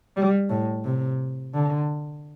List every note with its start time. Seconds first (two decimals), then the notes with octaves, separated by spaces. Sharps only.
0.17 G3
0.50 A2
0.85 C3
1.54 D3